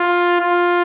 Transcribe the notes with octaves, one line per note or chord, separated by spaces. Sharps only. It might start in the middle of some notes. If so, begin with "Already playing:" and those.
Already playing: F4
F4